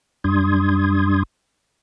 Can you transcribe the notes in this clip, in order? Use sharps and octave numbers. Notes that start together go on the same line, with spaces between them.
F#2 G3 D4 C6 D#6 G#6